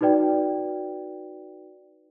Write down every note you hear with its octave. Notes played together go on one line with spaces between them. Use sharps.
D#4 F#4 B4 D5 G5